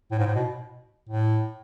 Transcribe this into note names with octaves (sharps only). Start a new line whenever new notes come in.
A2
G#2
A2
B2
A2